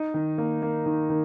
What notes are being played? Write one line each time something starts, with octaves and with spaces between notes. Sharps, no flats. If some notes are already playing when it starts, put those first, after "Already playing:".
Already playing: D#4
D#3
A#3
A#3
D#3
D#3